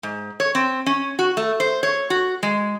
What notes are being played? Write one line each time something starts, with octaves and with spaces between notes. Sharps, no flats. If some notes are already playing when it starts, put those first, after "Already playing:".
G#2
C#5
C4
C#4
F#4
A3
C5
C#5
F#4
G#3